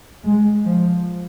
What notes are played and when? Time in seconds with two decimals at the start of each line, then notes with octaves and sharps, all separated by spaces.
0.24 G#3
0.66 F3